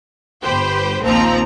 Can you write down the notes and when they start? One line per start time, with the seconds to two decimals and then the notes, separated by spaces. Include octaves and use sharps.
0.42 G1 G4 B4 C5 G5
1.04 A#1 D#2 F3 C4 A#5